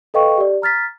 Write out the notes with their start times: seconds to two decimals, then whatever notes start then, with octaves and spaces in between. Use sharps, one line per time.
0.14 A4 B4 D#5 F5 G5 C#6
0.38 G4 D5
0.62 A#5 F6 A6 B6